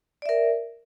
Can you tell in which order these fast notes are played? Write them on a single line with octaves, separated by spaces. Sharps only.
D5 E5 A#4